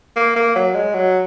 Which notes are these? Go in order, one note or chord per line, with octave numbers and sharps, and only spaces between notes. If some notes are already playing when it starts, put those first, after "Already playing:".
A#3
A#3
F#3
G#3
F#3